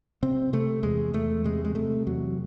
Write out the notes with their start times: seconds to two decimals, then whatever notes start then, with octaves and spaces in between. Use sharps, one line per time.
0.23 C3 C4
0.53 C3 A3
0.83 E2 G#3
1.13 E2 A3
1.44 C3 G#3
1.65 G#3
1.75 C3 A3
2.07 E2 F#3